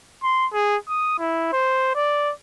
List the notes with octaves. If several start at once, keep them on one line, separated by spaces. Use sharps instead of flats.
C6
G#4
D#6
E4
C5
D5